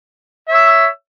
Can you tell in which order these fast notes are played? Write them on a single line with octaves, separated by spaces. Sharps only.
E5 C#5 E6